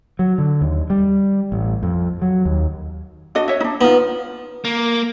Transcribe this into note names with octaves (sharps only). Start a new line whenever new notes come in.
F#3
D3
D#2
G3
A1
F2
F#3
D#2
D4 F#4 D#5
C#5 E5
D4 D#4
B3 D#4 F4
A#3